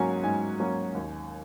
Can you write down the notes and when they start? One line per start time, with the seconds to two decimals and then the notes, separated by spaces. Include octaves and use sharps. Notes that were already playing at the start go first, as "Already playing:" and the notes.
Already playing: G#2 F#3 A#3 C#4 G#5
0.23 G#2 G#5
0.60 F#3 A#3 C#4
0.95 D#2